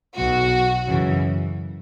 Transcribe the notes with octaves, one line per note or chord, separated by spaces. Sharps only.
B1 B2 F#3 F#4
F#2 C#3 E3